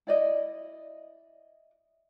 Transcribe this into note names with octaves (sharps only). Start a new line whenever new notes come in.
E4 D5 D#5